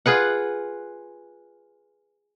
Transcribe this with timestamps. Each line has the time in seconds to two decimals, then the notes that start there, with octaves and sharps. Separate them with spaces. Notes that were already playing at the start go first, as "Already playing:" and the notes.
0.06 F4 G#4 B4 F#5